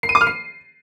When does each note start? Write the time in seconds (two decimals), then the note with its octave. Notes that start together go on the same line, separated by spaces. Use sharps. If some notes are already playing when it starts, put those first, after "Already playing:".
0.03 C7
0.09 D#7
0.15 D6
0.21 F6
0.27 C7